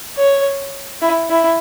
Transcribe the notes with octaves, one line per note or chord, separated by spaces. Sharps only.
C#5
E4
E4